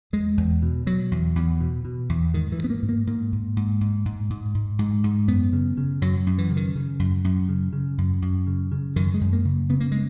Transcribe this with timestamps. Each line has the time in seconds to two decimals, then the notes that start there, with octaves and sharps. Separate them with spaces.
0.13 E2 G#3
0.37 E2
0.62 B2
0.86 B2 F#3
1.11 E2
1.36 E2
1.61 B2
1.85 B2
2.09 E2
2.34 G#2 D#3
2.52 E3
2.58 G#2
2.64 B3
2.70 A#3
2.82 G#2
2.89 A#3
3.07 G#2 A#3
3.32 G#2
3.56 G#2
3.81 G#2
4.05 G#2
4.30 G#2
4.55 G#2
4.79 G#2
5.04 G#2
5.28 F#2 B3
5.53 C#3
5.77 C#3
6.02 F#2 F#3
6.27 F#2
6.38 E3
6.50 C#3
6.57 D#3
6.76 C#3
6.99 F#2
7.24 F#2
7.49 C#3
7.73 C#3
7.98 F#2
8.22 F#2
8.47 C#3
8.72 C#3
8.96 F#2 D#3
9.14 G#3
9.21 F#2
9.33 A#3
9.45 C#3
9.70 C#3 B3
9.80 A#3
9.92 G#3